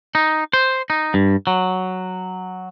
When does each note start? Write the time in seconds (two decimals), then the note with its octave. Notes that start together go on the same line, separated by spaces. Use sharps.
0.15 D#4
0.53 C5
0.90 D#4
1.14 G2
1.47 F#3